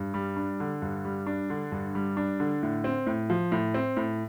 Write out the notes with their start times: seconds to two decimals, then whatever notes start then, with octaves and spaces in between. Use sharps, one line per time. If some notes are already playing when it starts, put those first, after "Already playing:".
Already playing: G2
0.14 G3
0.37 D4
0.60 D3
0.82 G2
1.05 G3
1.27 D4
1.50 D3
1.72 G2
1.95 G3
2.17 D4
2.40 D3
2.63 A2
2.84 C4
3.07 A2
3.30 F3
3.52 A2
3.74 C4
3.97 A2